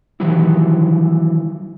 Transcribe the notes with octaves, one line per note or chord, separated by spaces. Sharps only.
D#3 E3 F#3 G3 E4